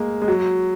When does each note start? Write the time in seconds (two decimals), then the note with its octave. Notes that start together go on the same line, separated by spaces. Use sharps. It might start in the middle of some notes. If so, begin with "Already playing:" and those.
Already playing: G#3 A#3
0.22 G#3
0.28 F#3